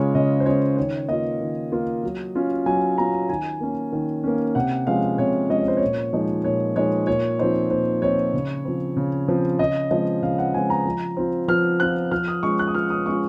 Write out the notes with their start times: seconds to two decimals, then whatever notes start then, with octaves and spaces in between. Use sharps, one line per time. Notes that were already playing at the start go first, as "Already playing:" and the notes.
Already playing: C#3 G#3 C#4 F4 C#5
0.15 C#3 D#5
0.40 C5
0.46 G#3 C#4 F4 C#5
0.77 D#3 C#5
1.09 A#3 F4 D#5
1.41 D#3
1.72 A#3 F4
2.03 F#3
2.35 C#4 F4
2.66 F#3 G#5
2.98 C#4 F4 A#5
3.29 D#3 G#5
3.61 A#3 C#4
3.92 D#3
4.24 A#3 C#4
4.55 C3 F#5
4.87 F3 G#3 C#4 F5
5.18 C3 C#5
5.49 F3 G#3 C#4 D#5
5.59 C#5
5.68 C5
5.77 A#2 C#5
6.13 F3 G#3 D#4
6.44 A#2 C#5
6.76 F3 G#3 D#4 C#5
7.07 A#2 C#5
7.39 F3 C4 D#4 C5
7.70 A#2 C5
8.02 F3 C4 D#4 C#5
8.33 C#3
8.65 F3 C4
8.96 C#3
9.28 F3 C4
9.59 C#3 D#5
9.91 F3 G#3 C4 D#5
10.23 C#3 F5
10.38 F#5
10.54 F3 G#3 C4 G#5
10.70 A#5
10.86 F3
11.17 C4 F4
11.48 F3 F6
11.80 C4 F4 F#6
12.11 F3 F6
12.28 D#6
12.43 G#3 C#4 F4 C#6
12.59 F#6
12.68 D#6
12.75 F3 F6
12.90 D#6
13.06 G#3 C#4 F4 C#6